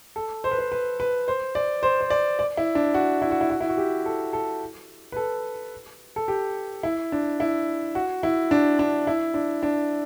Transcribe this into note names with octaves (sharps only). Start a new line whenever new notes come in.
A4
C5
B4
C5
B4
B4
C5
D5
C5
C5
D5
D5
E4
D4
F#4
E4
F#4
E4
F#4
E4
F#4
G4
A4
A4
B4
A4
A4
G4
E4
D4
E4
F#4
E4
D4
D4
E4
D4
D4